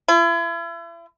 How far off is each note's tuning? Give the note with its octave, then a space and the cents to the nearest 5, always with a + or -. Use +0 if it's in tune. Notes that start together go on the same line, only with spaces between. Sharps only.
E4 +40